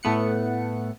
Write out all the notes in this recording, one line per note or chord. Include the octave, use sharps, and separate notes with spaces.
A2 A3 B3 F#5 C#7